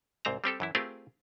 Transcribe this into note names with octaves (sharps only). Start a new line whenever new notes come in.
C2 G#2 C4 C5 A#5
G3 C4 G4 A4
F#2 E3 E4
A3 C4 F4 G4 G#4 A#4